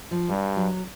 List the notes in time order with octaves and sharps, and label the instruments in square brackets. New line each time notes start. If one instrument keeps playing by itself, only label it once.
[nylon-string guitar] F3
[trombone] G2 [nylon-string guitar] G3
[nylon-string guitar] F#3